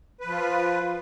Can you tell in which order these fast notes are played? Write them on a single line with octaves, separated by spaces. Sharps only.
B4 F3 F4